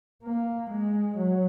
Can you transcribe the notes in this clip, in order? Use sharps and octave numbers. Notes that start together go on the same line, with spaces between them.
A#3
G#3
F#3